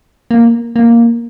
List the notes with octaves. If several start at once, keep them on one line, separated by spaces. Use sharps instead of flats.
A#3
A#3